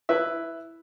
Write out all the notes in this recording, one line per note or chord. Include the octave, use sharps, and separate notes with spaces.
E4 B4 E5